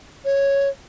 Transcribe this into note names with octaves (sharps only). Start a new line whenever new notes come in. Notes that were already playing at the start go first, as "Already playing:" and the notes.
C#5